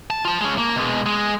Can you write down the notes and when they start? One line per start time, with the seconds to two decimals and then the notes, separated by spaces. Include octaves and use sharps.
0.10 A5
0.25 F4 A5
0.41 G#3 C#4
0.58 A#3
0.76 B2 G#3
1.06 G#3